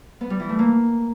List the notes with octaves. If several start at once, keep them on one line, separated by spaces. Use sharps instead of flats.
B3
G3
E3
A3
A#3